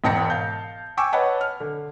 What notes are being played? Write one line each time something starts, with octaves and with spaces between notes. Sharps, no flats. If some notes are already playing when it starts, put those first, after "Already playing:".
E1 G#2 G5 A5 A#6 C#7
F5 A5 G6
G5 G#5 C#6 D6 E6
B4 C#5 D#5 F#5 A5
F6
D3